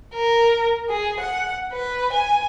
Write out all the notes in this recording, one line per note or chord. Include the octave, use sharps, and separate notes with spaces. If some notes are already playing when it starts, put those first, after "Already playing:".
A#4
G#4
F#5
B4
G#5